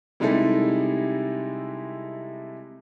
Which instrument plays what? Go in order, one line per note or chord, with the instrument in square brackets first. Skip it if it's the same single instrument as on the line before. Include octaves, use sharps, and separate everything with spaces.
[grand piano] C3 G3 G#3 D#4 E4 A4